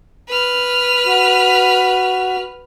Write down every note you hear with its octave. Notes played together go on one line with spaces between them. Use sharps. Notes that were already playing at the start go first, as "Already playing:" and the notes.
B4 F6
F#4